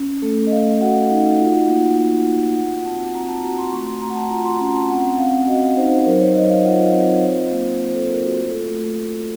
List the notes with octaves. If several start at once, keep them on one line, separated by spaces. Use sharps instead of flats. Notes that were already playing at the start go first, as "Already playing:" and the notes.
Already playing: C#4
A3 A4
D#5
A3 F5
F#4 F#5
D#4
F4
A#3
A#3 F#5
F4
F#4 F#5
C4 A5
C4 A#5
F#5
A5
F#4 A#5
C6
A3 C#6
C6
A3 A#5
F#5
A5
F4 A#5
C6
C#4 C6
A#5
A5
C4 F#5
C4 F5
F#4 D#5
D#4 C5
C5
F#3 A#4
C#5
F#3 D#5
F5
F4 F#5
F5
D#5
F5
C4
F4 C5
A#3
A#3 C5
A4
F4 A#4
F#4
A3 A4
A3